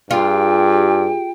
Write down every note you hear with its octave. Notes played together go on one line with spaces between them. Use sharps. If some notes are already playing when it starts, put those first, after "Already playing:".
G2 F4 G4 G#4 G5